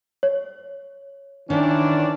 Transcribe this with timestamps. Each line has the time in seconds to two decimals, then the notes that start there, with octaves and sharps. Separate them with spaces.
0.23 C#5
1.50 D#3 E3 C#4 D4